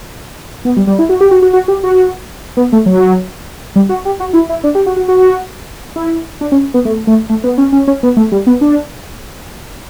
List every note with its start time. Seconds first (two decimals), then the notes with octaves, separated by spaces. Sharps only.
0.65 B3
0.76 G3
0.87 G3
0.99 E4
1.09 F#4
1.21 G4
1.31 F#4
1.42 F#4
1.53 F#4
1.68 G4
1.83 F#4
2.57 B3
2.72 A3
2.86 F#3
3.76 G3
3.89 F#4
4.05 G4
4.20 F#4
4.33 E4
4.49 E4
4.64 D4
4.75 G4
4.86 F#4
4.96 F#4
5.08 F#4
5.96 E4
6.41 D4
6.52 C#4
6.74 B3
6.85 A3
7.07 A3
7.29 A3
7.44 B3
7.58 C#4
7.72 C#4
7.87 C#4
8.03 B3
8.17 A3
8.32 G3
8.47 B3
8.61 D4